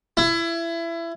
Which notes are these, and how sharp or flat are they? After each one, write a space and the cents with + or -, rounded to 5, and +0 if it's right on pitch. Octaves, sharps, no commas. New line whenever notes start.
E4 +25